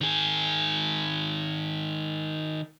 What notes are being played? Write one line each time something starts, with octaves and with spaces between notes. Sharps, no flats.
D#3 G#4